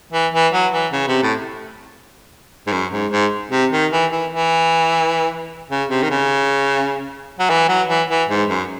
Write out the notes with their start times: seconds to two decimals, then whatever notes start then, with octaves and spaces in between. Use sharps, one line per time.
0.13 E3
0.34 E3
0.53 F#3
0.73 E3
0.93 C#3
1.08 C3
1.23 A2
2.67 G#2
2.72 F#2
2.92 G#2
3.11 G#2
3.51 C3
3.72 D#3
3.91 E3
4.11 E3
4.31 E3
5.70 C#3
5.90 C3
6.03 D#3
6.10 C#3
7.39 F#3
7.50 E3
7.69 F#3
7.89 E3
8.10 E3
8.29 G#2
8.49 F#2